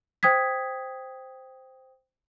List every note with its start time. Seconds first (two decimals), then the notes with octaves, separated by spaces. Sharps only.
0.23 C5 G5 D#6 G#6 B6